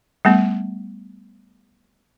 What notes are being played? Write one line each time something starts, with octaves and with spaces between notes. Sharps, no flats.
G3 A3 B3